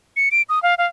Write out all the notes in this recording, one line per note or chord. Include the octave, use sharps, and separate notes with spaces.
C#7
D7
D#6
F5
F5